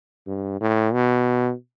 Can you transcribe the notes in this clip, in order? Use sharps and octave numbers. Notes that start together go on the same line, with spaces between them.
G2
A2
B2